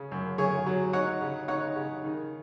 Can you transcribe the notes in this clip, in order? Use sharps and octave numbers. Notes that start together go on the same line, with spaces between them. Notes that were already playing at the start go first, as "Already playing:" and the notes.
Already playing: C#3
F#2
F#2 G#4 C#5
F#3
D#4 C#5 F#5
C#3
D#4 C#5 F#5
C#3
D#3